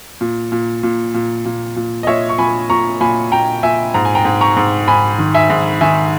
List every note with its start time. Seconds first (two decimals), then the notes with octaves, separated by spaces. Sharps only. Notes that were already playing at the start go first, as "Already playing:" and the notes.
0.21 A#2
0.52 A#2
0.83 A#2
1.14 A#2
1.45 A#2
1.76 A#2
2.03 D#5
2.07 A#2 C#5 E5
2.29 C#6
2.38 A#2 G#5 B5
2.70 A#2 A#5 C#6
3.01 A#2 G#5 B5
3.32 A#2 G5 A#5
3.63 A#2 E5 G#5
3.94 G#2 A#5
4.05 G#5
4.15 G5 A#5
4.25 G#2
4.41 A#5 C#6
4.56 G#2
4.87 G#2 G#5 B5
5.18 D#3
5.34 E5 G#5
5.50 G#2
5.81 D#3 E5 G#5